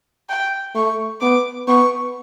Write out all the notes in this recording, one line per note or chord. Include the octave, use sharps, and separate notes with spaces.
G5
A3 C#6
B3 D6
B3 C#6